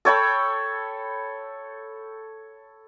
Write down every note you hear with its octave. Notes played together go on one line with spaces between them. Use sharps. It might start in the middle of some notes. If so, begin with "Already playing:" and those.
A4 C#5 G5 B5